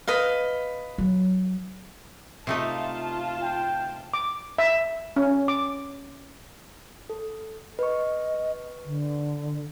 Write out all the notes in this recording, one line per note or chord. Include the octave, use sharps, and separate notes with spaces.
B4 D#5 F5
F#3
C3 A3 D#4 F4 A5
G5
D6
E5
C#4
D6
A4
B4 D#5 C#6
D3